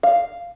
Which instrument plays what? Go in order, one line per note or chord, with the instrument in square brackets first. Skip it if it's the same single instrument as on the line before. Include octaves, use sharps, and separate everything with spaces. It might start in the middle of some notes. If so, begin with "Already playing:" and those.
[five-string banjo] F5